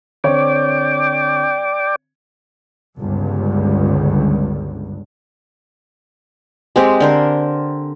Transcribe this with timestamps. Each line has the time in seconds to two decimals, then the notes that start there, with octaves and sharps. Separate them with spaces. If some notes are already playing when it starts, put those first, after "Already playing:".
0.24 D3 C4 C#5 D5 G5 D6
2.97 G1 C#2 G2
6.76 G#3 C4 G4
7.00 D3 A#4 C5